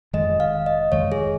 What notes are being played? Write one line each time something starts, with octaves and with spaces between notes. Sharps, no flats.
F1 F2 D#3 G#3 D#5
F5
D#5
F1 F2 D#3 G#3 C#5
G#4